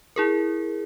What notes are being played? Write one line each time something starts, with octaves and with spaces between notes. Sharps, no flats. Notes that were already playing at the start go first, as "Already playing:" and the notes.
E4 G#4 A#4